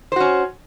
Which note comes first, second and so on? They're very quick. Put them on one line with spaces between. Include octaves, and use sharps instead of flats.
C5 F#4 C#4